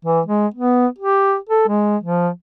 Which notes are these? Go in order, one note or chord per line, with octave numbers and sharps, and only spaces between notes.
E3
G#3
B3
G4
A4
G#3
F3